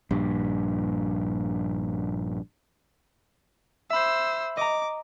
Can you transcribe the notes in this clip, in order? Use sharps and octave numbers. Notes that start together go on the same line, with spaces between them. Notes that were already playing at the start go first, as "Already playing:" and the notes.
A#1 G2
C5 E5 B5 E6
D#5 A#5 D6